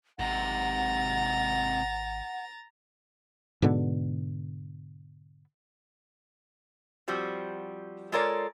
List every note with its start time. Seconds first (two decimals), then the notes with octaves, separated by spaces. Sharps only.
0.19 G#1 G#2 C3 F#5 A#5 A6
3.62 G#2 B2 D3 B3
7.08 F3 G3 C4 F#4
8.12 G#3 F4 A4 A#4 C#5 D5